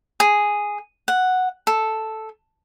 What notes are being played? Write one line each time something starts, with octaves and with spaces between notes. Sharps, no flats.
G#4
F#5
A4